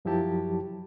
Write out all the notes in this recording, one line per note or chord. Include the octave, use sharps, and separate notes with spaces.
F#2 F3 F#3 E4 G4 A5